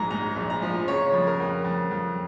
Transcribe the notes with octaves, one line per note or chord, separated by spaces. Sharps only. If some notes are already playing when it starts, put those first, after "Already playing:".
Already playing: A#1 G#2 A#5
G#2 A#5
A#1
A#5
F3
C#3 C#5
F2
A#4
F2
F2
F2